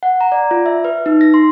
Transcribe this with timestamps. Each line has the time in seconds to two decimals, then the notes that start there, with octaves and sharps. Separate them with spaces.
0.03 F#5
0.21 A#5
0.32 D5
0.51 F4
0.66 E5
0.84 B4
1.06 D#4
1.21 A#6
1.34 C6